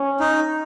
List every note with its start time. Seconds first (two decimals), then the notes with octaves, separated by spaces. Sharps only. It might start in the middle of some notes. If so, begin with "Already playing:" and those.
Already playing: C#4
0.20 D#4